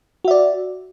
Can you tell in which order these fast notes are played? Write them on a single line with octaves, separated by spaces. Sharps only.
F#4 E5 D5